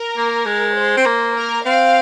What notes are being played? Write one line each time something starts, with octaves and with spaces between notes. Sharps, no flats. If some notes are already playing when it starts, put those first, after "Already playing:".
Already playing: A#4
A#3
G#3
C5
C4
A#3
A#4
C4 F5